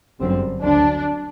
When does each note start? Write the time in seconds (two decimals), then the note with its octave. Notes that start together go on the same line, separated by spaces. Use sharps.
0.20 G1 F#2 D3 G3 C4
0.62 D2 D3 F#3 D4